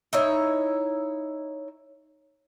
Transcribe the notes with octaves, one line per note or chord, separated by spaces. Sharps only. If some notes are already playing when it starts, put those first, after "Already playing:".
D#4 E4 C#5